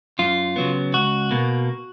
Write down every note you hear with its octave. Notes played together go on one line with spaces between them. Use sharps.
F#2 F4
C#3 F#3 B3
C#2 F#4
B2 A#3